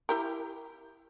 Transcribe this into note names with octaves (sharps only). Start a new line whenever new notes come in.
E4 G4 A#4